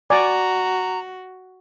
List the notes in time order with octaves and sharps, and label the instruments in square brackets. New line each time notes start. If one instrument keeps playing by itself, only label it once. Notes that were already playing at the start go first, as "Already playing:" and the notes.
[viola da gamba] F#4 [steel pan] D5 G#5 [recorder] A#5